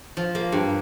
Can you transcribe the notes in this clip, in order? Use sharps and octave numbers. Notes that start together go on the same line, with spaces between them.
F3
A#3
G2